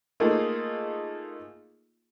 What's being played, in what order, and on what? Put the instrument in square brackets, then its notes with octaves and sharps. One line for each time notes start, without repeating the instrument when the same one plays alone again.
[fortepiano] A3 A#3 D#4 F4 G#4